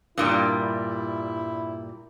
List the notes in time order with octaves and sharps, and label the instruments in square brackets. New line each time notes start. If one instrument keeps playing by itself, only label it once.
[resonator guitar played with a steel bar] G2 A#2 G3 [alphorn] E4